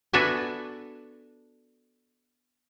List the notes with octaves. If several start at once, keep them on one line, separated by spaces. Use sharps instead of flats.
B3 D4 F#4 A4 E5 G#5